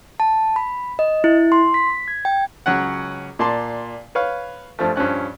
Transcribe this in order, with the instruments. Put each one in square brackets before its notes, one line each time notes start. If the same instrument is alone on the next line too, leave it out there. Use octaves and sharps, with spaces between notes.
[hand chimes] A5
B5
D#5
E4
C6
B6
G#6
G5
[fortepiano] C#2 F#3 C#4 F#5
A#2 D5 A5 C6
B4 C#5 F5
G2 F3 A3
G2 F3 C#4 F#6